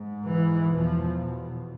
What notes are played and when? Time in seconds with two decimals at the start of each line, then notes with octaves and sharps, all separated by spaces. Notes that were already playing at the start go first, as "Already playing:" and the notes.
Already playing: G#2
0.26 E3
0.72 E2 B2 F3